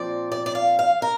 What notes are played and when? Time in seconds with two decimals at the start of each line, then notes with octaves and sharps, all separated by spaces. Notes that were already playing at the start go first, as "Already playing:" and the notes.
Already playing: A#2 F3 C4 D5
0.32 D5
0.46 D5
0.55 F5
0.79 F5
1.02 A#4